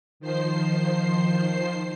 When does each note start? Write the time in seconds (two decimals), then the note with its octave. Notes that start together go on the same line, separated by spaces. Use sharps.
0.20 D#3 F3 C5 C7